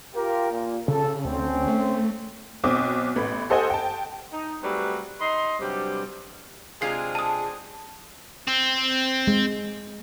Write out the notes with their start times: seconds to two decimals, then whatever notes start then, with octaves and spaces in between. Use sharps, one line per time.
0.15 F4 G4 A#4
0.51 A#2
0.88 C#3 A4
1.25 D2 C4 C#4
1.68 A3
2.64 B1 B2 C4 D6 D#6
3.16 A1 A2 B3 B5
3.50 G4 A4 C5 D#5 F#5 G#5
3.70 G5 A5
4.33 D#4
4.63 F#3 G3 A3 C4 G#4 B4
5.20 D#4 D#5 B5 C6
5.60 G2 C3 F#3 G3 G4
6.82 C3 G#3 C4 D4 F4 G#4 C7
7.15 A4 A5 D#6
8.48 C4
9.27 G#3